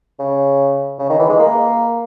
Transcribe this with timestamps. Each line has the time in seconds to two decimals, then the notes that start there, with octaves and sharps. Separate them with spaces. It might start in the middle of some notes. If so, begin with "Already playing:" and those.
0.19 C#3
0.99 C#3
1.09 D#3
1.19 E3
1.29 G#3
1.39 A#3